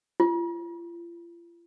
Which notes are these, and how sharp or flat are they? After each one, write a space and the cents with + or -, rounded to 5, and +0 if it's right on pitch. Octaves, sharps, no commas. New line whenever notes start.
F4 -40